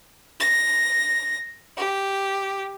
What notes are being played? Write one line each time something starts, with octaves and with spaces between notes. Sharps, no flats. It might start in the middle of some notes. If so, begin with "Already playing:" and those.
A#6
G4